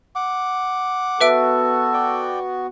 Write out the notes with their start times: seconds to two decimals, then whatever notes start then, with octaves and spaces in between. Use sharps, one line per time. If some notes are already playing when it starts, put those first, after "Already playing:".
0.16 F#5 D6
1.21 B3 F#4 A4 B4 E5 D7
1.94 D5 G5